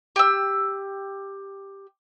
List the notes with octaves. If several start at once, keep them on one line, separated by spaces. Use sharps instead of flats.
G4 E6